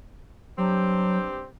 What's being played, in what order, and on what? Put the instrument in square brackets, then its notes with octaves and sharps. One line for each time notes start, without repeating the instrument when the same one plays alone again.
[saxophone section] G2 C4 G4 [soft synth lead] F#3